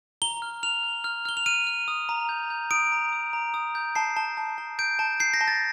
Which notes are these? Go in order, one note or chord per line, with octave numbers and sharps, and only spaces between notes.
A#5 G7
F6
F6 F7
F6
F6
F6 G7
F7
F6 D#7
F6
D#6
A#5
G6
G6
D#6 D7
A#5
D#6
A#5
D#6
G6
A5 C7
A5
A5
A5
G6 D7
A5
G6 C7
A#6
A5
A6